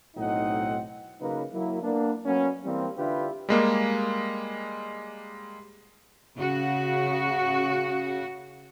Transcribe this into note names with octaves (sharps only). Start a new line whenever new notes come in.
B1 A2 C4 D#4 D#5 F#5
C#3 F#3 A#3 D#4 B4
F#3 A#3 E4
A#3 B3 D4
F#3 A#3 B3 C#4
E3 G3 A#3 C4
D3 D4 E4 F4 G4 B4
G3 G#3 A#3
C#3 F#4